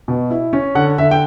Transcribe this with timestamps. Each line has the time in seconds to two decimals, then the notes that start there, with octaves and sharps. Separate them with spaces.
0.08 B2
0.30 E4
0.53 C#4
0.75 D3 F#5
0.98 D3 E5
1.11 G5